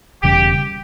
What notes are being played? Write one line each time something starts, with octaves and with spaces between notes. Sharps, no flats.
E1 E2 C#3 G3 G4